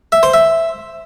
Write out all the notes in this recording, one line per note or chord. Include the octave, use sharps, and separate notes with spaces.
E5
C5
E5